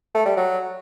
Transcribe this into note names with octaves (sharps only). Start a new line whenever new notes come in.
A3
G3
F#3